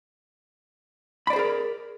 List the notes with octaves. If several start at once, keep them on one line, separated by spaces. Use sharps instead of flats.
G#4 A#4 C5 D5 B5